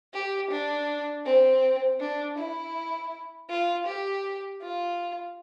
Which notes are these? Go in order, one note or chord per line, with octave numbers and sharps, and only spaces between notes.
G4
D4
C4
D4
E4
F4
G4
F4